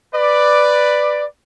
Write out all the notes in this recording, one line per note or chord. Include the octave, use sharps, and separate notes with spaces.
B4 D5